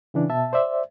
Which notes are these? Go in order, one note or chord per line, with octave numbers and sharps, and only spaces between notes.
C#3 E3 D4
B2 E5 A5
C5 D5 E5